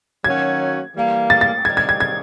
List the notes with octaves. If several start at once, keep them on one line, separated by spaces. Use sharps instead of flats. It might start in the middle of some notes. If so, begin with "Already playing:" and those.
D#3 F#3 A#3 C#4 F#4 G#6
E3 G3 A#3
A6
A6
C3 D#3 G3 G#6
G#6
G#6
G#6